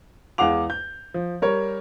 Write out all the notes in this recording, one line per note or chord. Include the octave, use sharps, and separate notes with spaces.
E2 G#3 F5 F#5 D6 F7
G6
F3
G3 A#4 C#5